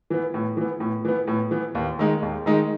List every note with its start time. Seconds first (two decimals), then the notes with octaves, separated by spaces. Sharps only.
0.10 E3 B3
0.34 A2
0.57 E3 B3
0.80 A2
1.05 E3 B3
1.27 A2
1.51 E3 B3
1.75 D#2
1.99 D#3 G#3 D#4
2.22 D#2
2.46 D#3 G#3 D#4